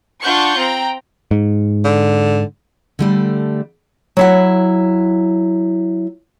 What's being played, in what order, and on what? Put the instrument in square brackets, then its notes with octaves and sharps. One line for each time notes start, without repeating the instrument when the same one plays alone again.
[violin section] D4 F4 F#5 C#6 G6 C#7
C4 G5 A#5
[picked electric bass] G#2
[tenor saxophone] D3
[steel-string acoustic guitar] D3 G3 A3
[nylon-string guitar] F#3 E4 F#5